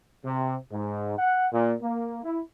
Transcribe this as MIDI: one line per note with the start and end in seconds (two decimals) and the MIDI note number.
0.25 0.56 48
0.72 1.14 44
1.18 1.48 78
1.52 1.73 46
1.82 2.22 58
2.24 2.41 64